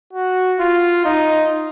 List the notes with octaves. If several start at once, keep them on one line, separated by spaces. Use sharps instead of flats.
F#4
F4
D#4